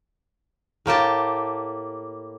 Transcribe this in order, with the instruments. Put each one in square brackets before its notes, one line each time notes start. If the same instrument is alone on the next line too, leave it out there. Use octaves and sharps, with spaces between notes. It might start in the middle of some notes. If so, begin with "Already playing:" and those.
[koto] A2 A#3 G4 A5